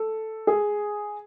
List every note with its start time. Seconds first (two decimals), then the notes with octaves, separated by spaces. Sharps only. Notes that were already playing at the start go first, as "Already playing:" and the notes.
Already playing: A4
0.47 G#4